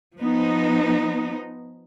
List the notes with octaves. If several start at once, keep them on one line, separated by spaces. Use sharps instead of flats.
F3 B3 D#4